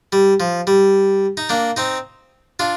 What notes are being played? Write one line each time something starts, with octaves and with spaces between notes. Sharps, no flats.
G3
F3
G3
D#4
A#3 D4
C4 D#4
D4 F4